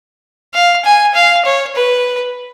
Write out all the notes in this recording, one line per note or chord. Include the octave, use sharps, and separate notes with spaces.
F5
G#5
F5
C#5
B4